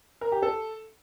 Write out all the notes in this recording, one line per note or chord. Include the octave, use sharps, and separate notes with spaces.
A#4
G4
A4